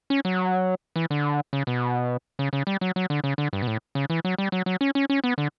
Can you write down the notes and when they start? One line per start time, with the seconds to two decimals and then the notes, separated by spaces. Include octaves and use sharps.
0.10 C#4
0.25 F#3
0.96 E3
1.10 D3
1.53 C#3
1.67 B2
2.39 C#3
2.53 C#3
2.67 G3
2.81 F#3
2.96 F#3
3.10 D3
3.24 C#3
3.38 D3
3.53 G2
3.62 B2
3.67 A2
3.95 C#3
4.10 E3
4.25 F#3
4.38 G3
4.52 F#3
4.66 F#3
4.81 C#4
4.95 C#4
5.10 C#4
5.24 B3
5.38 D3